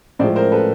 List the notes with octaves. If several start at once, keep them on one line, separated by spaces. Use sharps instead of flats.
A2 F3 G#3 C5 D5
A#4 C5
A4 B4